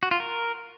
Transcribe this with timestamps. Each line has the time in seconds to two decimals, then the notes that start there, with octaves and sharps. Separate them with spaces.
0.03 F#4
0.11 F4
0.20 A#4